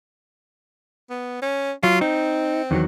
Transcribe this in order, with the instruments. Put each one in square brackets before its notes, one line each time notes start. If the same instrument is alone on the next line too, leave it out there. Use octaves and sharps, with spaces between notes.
[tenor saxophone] B3
C#4
[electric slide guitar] F#3 [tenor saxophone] F4
[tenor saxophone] C4 [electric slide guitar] D#4
[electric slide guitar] E2 D#3 F#3